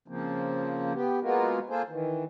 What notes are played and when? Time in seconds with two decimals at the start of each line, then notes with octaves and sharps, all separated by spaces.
0.08 C#3 F3 A#3 C4
0.94 B3 G4
1.23 G#3 A#3 B3 F4 F#4 A#4
1.69 A#3 F4 G#4 A4 C5
1.89 D#3 E3